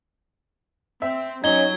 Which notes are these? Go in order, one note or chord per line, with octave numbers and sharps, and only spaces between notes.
C4 E5
F#3 C#4 D#4 G#6 G7